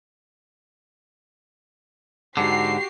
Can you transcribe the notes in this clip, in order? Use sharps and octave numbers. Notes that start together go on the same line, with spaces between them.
G#2 D3 F#4 G4 C7